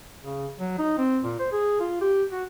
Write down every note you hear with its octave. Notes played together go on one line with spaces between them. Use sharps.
C#3
F#3
D#4
C4
A#2
C5
G#4
F4
G4
F#4